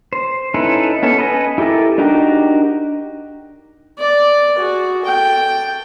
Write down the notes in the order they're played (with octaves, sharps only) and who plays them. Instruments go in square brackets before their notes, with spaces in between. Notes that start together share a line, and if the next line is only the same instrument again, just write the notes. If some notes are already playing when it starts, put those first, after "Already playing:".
[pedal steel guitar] C5
C#4 D#4 E4 A4 B4
B3 C#4 A4
B4 D#5 G#5
E4 G4 A4 A#4
D4 D#4 F#4 G4 A#4
[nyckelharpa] D5
F#4 G#4
A4 G5